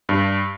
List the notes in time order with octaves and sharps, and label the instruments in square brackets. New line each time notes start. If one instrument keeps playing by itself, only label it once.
[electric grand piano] G2